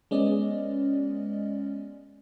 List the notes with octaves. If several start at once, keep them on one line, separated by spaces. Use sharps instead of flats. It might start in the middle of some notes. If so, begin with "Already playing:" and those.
G#3 B3 C#4 D5 D#5